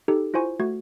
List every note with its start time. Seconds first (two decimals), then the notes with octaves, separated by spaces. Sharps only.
0.08 D#4 G4 A4
0.34 E4 F4 C5 G#5 C#6
0.60 A3 F#4 G#6